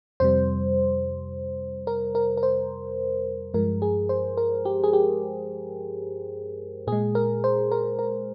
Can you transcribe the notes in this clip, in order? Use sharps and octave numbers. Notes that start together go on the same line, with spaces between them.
F2 C3 G3 C5
A#4
A#4
A#4
C5
G2 F3 G#3 A#4
G#4
C5
A#4
G4
G#4
G4
A#2 G#3 G#4
A#4
C5
A#4
A#4